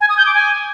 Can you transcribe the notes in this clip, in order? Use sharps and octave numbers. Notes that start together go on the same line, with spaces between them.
G#5
D#6
G6
D6
G#5